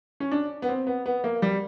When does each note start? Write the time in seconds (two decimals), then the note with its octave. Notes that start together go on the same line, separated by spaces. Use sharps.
0.20 C#4
0.32 D4
0.62 B3
0.69 C4
0.87 B3
1.06 B3
1.24 A#3
1.42 G3